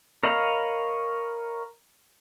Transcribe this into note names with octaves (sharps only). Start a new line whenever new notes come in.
A#4 C#5 D#5 F5 B5